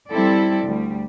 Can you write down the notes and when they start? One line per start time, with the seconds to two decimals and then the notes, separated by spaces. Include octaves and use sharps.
0.10 G3 C4 E4 A4 D5
0.66 D2 G3